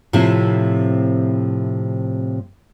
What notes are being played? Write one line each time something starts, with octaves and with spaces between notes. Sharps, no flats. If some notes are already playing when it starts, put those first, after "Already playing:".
A2 C3 F3 C4 E4